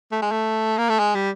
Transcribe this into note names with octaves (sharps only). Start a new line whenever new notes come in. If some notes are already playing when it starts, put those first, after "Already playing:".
A3
G#3
A3
A#3
A3
G#3
G3